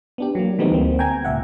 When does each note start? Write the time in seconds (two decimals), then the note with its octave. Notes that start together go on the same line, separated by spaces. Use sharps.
0.18 B3 D4 G4
0.35 F#3 A#3
0.58 E3 G3 A3 B3 C4 D#4
0.72 D2 A#3 C4
0.99 G5 G#5 A#5 G#6
1.25 C#2 A#2 E5 F#5